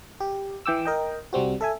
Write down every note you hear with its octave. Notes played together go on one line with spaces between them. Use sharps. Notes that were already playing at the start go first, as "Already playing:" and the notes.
G4
E3 G5 D6 E6
A#4 D#5 G5
C2 G3 C4 F#4
A4 E5 G#5